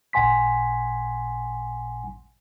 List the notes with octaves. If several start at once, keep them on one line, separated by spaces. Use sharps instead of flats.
A1 A#2 F#5 G#5 C6 B6